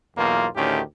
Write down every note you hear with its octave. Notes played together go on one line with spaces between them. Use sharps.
B1 E2 B2 A#3 F4
D2 A2 D#3 C#4 G4